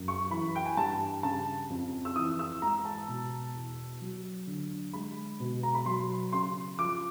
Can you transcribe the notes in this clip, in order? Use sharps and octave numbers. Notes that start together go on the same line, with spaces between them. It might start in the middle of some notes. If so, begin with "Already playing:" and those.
Already playing: F#2
C#6
E3 B5
G5
G#5
G2 A5
C#3 A5
F2
E6
E3 D#6
E6
G#2 A#5
A#5
A5
B2
E2
F#3
D3
G#3 B5
B2
A#5
B5
F#3 C6
C#3 C6
F3 D6